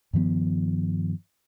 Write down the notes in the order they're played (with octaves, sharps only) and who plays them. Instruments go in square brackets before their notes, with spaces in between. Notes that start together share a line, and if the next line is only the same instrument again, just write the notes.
[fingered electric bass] G2 D#3 F3 B3